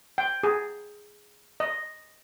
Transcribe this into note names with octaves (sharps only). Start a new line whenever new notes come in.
G5
G#4
D#5